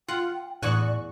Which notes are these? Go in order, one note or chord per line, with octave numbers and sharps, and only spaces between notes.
F4 F#5 G5
E2 A2 F#4 D5 G#5 C#6 F#6